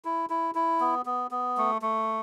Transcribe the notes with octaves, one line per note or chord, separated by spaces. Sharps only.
E4
E4
E4
B3
B3
B3
A3
A3